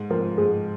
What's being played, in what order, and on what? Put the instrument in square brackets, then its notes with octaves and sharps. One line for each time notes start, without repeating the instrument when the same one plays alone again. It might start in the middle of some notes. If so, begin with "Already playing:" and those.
Already playing: [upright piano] G#2
[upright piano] F3 C4 [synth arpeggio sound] A#4
[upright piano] G#2 [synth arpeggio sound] G#4